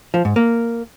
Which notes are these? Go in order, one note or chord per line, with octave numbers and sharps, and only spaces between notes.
F3
G#2
A#3